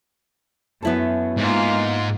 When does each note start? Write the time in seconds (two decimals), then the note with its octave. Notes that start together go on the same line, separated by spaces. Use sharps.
0.83 F#2 B3 E4 A4
1.38 G#2 G#3 A#3 F4